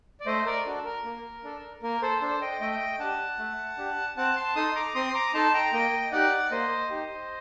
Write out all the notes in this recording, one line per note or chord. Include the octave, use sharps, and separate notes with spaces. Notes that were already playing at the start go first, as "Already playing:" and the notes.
D5
A3 C5 D#5
A#4 D5
D4 F#4 A4
A#4
A#3
D4 A4
A#3 A#4
A4 C5
D4 A4 C5
D#5 G5
A3 D#5 G5
D4 G4 F#5 A5
A3
D4 G4
C4 F#5 A5
A5 C6
D#4 A4 C6 D#6
C6
A#5 D6
C4 C6 D#6
C6
A#5 D6
D#4 A4 A5 C6
G5 A#5
A#3 D#5 G5
D#4 G4 D5 F#5
A#3 C5 D#5
D#4 G4